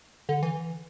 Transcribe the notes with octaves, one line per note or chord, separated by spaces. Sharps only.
D3
E3